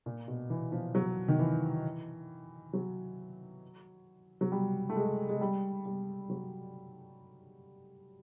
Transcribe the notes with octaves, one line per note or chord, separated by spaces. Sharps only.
A#2
B2
E3
F3
F#3
D#3
E3
F#3
F#3
G3
A3
G#3
G#3
G3
G3
F#3